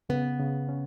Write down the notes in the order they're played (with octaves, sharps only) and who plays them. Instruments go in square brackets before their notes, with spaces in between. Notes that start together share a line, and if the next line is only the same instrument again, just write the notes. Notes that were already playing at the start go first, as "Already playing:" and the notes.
[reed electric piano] C#3 [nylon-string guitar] B3
[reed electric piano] C#3
C#4